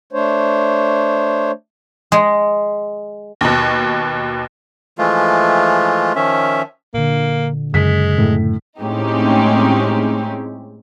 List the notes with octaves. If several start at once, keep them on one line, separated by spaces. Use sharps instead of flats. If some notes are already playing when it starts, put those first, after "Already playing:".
A3 D4 C5 C#5
G#3
D#2 B2
E3 F3 G#3 A3 F4
D#3 F3 C#4 E5
A#2 D3 A#3
F#2 C#3 G#3 B6
A2
A2 G#3 C4 C#4 D#4 G4